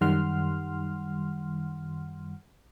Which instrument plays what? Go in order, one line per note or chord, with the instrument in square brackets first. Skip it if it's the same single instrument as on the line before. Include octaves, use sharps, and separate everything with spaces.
[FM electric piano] F#2 D#3 G3 F#5 C6 F6